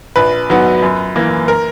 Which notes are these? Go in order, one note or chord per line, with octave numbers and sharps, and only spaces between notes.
A#1 B4
G#2 F#3 B3
F#2
E3 A#3
A#4